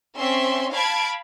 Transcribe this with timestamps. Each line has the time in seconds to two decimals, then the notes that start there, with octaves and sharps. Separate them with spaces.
0.17 C4 C#4 E5 C6
0.71 F5 A5 B5 G#6 D7